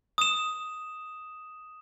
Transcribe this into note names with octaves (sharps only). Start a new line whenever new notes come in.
D#6 E7